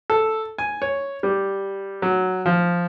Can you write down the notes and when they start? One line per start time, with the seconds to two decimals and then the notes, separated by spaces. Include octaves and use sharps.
0.10 A4
0.58 G#5
0.82 C#5
1.23 G3
2.02 F#3
2.45 F3